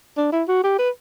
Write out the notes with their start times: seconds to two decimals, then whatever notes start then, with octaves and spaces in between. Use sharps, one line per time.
0.17 D4
0.32 E4
0.48 F#4
0.64 G4
0.79 B4